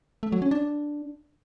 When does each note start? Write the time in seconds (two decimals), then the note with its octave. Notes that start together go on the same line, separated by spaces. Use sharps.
0.23 A3
0.32 F#3
0.42 C#4
0.51 D4